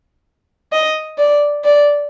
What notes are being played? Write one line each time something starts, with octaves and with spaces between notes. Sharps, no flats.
D#5
D5
D5